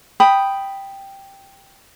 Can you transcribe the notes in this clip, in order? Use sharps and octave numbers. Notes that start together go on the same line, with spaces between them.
G5 B5 D#6